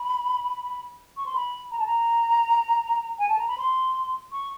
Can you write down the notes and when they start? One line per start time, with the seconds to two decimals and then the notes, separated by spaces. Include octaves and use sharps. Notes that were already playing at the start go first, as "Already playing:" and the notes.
Already playing: B5
1.17 C#6
1.26 C6
1.35 B5
1.71 A#5
1.79 A5
1.86 A#5
3.19 G#5
3.29 A5
3.38 A#5
3.48 B5
3.58 C6
4.32 C#6